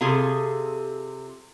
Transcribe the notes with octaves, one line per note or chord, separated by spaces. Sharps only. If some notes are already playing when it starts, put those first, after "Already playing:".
C3 F4 G#4 A4